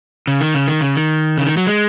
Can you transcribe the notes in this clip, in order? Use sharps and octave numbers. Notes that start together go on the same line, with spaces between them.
C#3
D#3
C#3
D#3
C#3
D#3
C#3
D#3
F#3
G#3